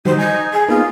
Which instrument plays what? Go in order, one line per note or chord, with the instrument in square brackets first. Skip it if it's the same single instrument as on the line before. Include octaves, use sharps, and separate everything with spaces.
[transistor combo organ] D#3 F#3 G3 [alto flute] D#4 [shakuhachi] C5
[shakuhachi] D#5 [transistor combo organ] G#5
[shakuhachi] G#4
[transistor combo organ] A#3 B3 D#4 [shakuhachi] F4 [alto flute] G#4